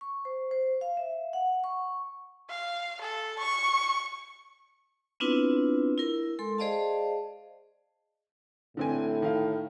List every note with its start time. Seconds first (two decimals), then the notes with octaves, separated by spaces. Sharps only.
0.01 C#6
0.25 C5
0.51 C5
0.81 F5
0.97 E5
1.33 F#5
1.64 C#6
2.49 F5
3.01 A4
3.39 C#6
5.20 B3 C4 D4 E4 F4 B4
5.98 E4 A#4
6.39 G#3 A4 C6
6.58 G#4 C5 D5 D#5 F5 A5
8.77 A2 D3 C4 G#5
9.22 D#3 F5